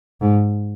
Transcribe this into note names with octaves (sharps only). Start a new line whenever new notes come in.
G#2